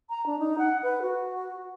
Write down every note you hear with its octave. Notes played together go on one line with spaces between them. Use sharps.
A#5
D4
D#4
F#5
B4
F#4